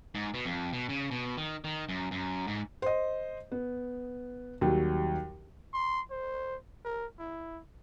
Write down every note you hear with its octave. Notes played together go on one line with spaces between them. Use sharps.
G#2
B2
F2
B2
C#3
B2
D#3
D#3
F#2
F#2
G#2
C5 D#5
B3
D#2 F#3 G3
C6
C5
A#4
E4